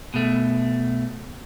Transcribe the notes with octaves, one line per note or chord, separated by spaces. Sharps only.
B2 A3